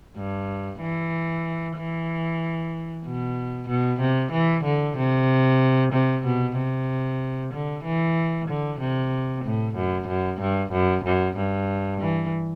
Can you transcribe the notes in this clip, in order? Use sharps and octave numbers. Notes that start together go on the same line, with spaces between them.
G2
E3
E3
B2
B2
C3
E3
D3
C3
C3
B2
C3
D3
E3
D3
C3
A2
F#2
F#2
G2
F#2
F#2
G2
E3